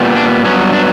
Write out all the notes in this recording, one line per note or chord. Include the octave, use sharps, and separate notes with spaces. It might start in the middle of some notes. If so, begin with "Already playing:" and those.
Already playing: A#2 G3 B3
D4
G2 F#3 B3 C#4
D4